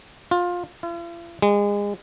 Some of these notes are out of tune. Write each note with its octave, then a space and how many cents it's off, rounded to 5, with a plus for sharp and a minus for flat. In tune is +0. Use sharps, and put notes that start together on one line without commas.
F4 +20
F4 -45
G#3 -30